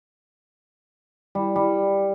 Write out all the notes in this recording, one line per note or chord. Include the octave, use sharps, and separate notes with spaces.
G3
G3